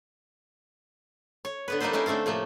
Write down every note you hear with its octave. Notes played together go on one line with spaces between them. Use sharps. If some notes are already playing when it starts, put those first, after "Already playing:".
C#5
D3 B3 B4
G3 A#3 D#4 A4 B4 C5
C#4 D#4 E4 A#4 C5
D3 A3 C4 A4 F5
A2 C3 F3 A3 A#3